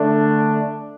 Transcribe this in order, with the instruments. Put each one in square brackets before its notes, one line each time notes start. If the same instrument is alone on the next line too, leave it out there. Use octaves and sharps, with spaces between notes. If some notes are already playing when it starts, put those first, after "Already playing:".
Already playing: [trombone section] D3 A3 D4